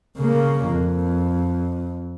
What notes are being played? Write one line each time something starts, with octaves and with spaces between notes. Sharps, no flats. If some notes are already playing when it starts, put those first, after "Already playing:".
C#3 A#3
F2